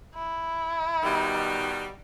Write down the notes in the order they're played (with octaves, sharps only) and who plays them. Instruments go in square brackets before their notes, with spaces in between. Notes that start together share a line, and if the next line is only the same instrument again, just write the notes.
[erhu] E4
[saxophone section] B2 D#3 G3